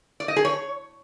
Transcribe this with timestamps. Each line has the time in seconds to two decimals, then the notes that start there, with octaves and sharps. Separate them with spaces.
0.20 D5
0.28 D#5
0.36 G#4
0.45 C#5